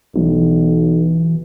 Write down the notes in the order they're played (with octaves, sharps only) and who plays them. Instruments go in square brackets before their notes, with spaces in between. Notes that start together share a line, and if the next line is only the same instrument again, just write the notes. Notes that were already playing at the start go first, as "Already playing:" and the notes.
[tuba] B1 [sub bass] E3